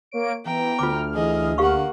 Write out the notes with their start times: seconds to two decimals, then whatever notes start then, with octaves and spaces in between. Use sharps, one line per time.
0.12 A#3 C#5 D7
0.45 E3 B3 G5 A#5
0.79 D2 F4 D6 F6
1.15 E3 G#4 D#5
1.58 D3 A#3 G4 F5 F#5 C#6